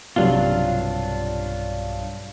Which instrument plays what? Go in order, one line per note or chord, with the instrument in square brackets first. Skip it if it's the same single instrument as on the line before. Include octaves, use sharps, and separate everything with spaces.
[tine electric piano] B1 G2 [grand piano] C3 F#3 [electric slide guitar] D4 F4